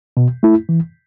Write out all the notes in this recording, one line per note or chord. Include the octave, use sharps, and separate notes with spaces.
B2
A3 E4
E3